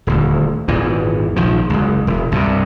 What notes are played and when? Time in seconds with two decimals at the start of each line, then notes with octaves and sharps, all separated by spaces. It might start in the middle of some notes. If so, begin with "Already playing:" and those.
0.07 D#1 D2
0.68 G#1 E2 A#2 E3
1.36 A#1 D#3 F3
1.70 F#1 C#2
2.07 E1
2.32 C2 G2 B2